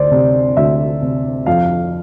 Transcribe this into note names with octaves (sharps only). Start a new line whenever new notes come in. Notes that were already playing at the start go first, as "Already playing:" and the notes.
Already playing: D2 C5 D5
C3
D2 E5
C3
F2 F5